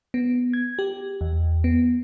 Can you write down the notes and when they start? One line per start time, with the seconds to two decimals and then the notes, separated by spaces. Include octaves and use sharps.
0.14 B3
0.53 G#6
0.79 G4
1.21 E2
1.64 B3